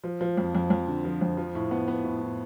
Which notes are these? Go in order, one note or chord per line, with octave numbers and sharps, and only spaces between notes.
F3
F3
F2
F2
F2
D3
F3
F2
F3
A2
B3
B3
A2
A2